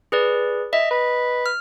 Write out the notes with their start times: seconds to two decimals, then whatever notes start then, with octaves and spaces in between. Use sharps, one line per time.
0.12 G#4 B4 D5
0.73 D#5 E5
0.91 B4
1.46 F6